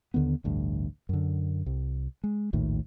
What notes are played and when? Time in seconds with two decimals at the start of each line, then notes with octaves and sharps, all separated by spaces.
0.14 D#2 D3 D#3 B3
0.44 A1 D2 G2
1.09 F#2 D3
1.66 C2
2.24 G#3
2.53 A#1 D#2 A2 D#3